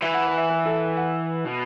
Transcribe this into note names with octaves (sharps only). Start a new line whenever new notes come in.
E3 E5
F#5
B4
E5
B4
A4
F#5
B2